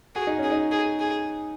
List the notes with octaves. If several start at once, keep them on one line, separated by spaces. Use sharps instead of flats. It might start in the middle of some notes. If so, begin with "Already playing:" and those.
F#4 G#4
D#4
C#4
G#4
D#4
G#4
G#4